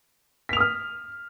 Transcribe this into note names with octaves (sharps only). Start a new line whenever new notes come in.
D#6 F6 B6 F7